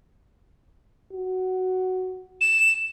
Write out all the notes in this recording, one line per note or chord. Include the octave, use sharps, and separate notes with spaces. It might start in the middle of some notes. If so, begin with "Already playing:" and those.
F#4
E7